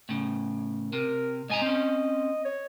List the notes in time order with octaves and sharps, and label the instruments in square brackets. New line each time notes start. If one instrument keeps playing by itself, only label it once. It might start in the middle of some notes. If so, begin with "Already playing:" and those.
[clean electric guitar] A2 C#3
[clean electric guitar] C3 [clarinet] A#4
[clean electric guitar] G#2 G#5 A#5 [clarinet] D#5
[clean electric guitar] C4 C#4
[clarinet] C#5